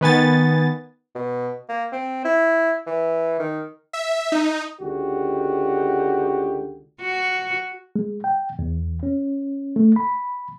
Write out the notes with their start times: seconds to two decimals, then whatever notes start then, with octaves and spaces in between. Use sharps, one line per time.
0.01 D#3 B3 G#5 A6
1.15 B2
1.69 A#3
1.92 C4
2.25 E4
2.87 E3
3.40 D#3
3.93 E5
4.32 D#4
4.80 C#2 D3 F#4 G4
7.01 F#4
7.96 G#3
8.24 G5
8.59 E2
9.03 C#4
9.76 A3
9.96 B5